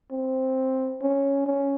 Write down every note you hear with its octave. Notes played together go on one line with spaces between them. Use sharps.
C4
C#4
C#4